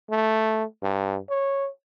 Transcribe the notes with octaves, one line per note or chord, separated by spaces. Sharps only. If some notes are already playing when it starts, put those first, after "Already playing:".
A3
G2
C#5